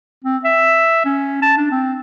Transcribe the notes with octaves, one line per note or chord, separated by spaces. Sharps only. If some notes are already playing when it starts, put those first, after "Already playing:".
C4
E5
C#4
A5
D4
C4